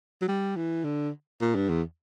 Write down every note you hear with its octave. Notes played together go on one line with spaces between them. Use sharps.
F#3
G3
E3
D3
A#2
G2
E2